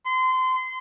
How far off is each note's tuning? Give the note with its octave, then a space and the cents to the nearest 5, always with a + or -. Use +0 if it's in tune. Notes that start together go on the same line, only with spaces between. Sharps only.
C6 -25